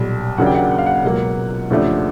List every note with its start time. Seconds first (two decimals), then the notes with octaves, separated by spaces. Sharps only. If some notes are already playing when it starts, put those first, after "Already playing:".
Already playing: B1 A#2 G3
0.38 D#2 C#3 F#3 A#3 D4 F#5
0.46 G5
0.55 F#5
0.71 F#5
0.78 F5
0.86 F#5
1.04 C#2 B2 F#3 A#3
1.70 D#2 C#3 F3 A3 D4